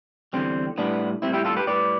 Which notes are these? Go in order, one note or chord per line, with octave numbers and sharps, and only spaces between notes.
E2 D3 G3 C4
A2 G3 B3 D4
A2 G3 C4 E4
E4 G4
F4 A4
G4 B4
A2 G3 B4 D5